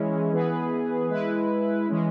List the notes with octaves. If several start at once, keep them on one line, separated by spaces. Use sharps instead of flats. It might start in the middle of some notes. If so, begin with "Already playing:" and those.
Already playing: E3 G#3 C#4 E4
E3 B3 G#4 B4
G#3 E4 B4
E3 G#3 C#4